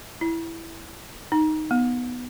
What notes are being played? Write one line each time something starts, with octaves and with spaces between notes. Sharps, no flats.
E4
D#4
B3